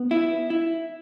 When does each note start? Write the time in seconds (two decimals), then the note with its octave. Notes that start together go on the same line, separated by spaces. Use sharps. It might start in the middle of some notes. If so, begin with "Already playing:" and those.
Already playing: B3
0.11 E4
0.50 E4